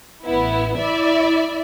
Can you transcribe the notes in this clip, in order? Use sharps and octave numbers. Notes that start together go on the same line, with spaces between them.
A1 B3 E4
E4 D5 E5